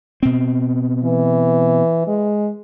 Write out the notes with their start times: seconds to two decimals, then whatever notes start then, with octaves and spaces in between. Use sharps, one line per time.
0.23 B2 C4
1.04 E3
2.07 G#3